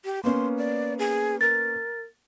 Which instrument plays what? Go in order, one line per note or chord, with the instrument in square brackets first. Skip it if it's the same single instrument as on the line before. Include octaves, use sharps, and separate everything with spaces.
[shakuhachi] G4
[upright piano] A#3 B3 C#4 [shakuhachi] C6
[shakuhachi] D5
G#4
[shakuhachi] A#4 [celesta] A6